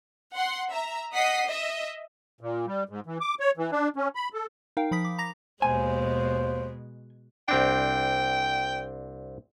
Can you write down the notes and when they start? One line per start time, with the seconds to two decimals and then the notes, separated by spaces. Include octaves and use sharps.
0.35 F#5 C6
0.71 E5 A#5
1.14 D#5 F#5 D#6 B6 C7
1.47 D#5 E5
2.41 A#2
2.67 G3
2.89 G#2
3.06 E3
3.21 D6
3.40 C#5
3.57 E3
3.72 D4
3.96 C#4
4.15 B5
4.34 A4
4.77 D#4 A#4 F5 G5
4.91 F3 B5 D#6 B6
5.05 D6
5.18 A#5 D6 A#6 F7
5.62 D#2 B2 G#3 C5 G#5
7.48 C2 C4 D4 G5